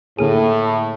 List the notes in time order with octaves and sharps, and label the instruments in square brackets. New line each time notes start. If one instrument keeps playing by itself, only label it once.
[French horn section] A2 [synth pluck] D3 A#3 G#4